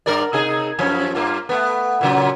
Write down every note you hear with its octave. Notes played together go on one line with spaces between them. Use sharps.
G2 A#4 D5
C3 D#4 G#4
F#2 F3 C#4
G2 A#3 F4
A3 B3
A#2 C#3 F#3